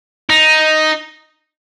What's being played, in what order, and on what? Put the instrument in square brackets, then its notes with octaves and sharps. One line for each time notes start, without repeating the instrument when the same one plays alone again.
[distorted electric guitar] D#4